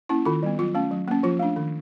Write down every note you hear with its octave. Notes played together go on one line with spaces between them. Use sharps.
A#3 C#4 E4
D#3 F4
G3 B3
F#3 F4
A3 C#4
F#3
A#3 C#4
F3 F4
A3 D4
D#3